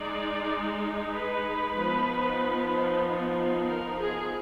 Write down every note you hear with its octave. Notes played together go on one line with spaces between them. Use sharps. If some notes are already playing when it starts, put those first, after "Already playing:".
Already playing: G#3 D#4 D5
B4
F3 B3 D#4
A#4
G#4